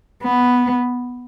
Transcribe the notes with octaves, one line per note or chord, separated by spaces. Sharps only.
B3